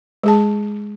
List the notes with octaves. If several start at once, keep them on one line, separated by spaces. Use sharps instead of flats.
G#3 G#4 A5